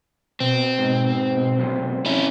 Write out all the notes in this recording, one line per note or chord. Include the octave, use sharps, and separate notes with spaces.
B2 C4
G#2
F#2 C3
C#4 E4